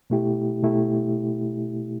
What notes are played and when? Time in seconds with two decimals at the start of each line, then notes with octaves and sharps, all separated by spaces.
0.10 B2 A3 E4 G4
0.63 B2 A3 E4 G4